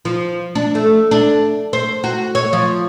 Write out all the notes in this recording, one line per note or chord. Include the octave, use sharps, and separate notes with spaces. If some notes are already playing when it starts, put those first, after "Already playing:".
F3
D4
A3
D4
C5
F#4
C#5
F3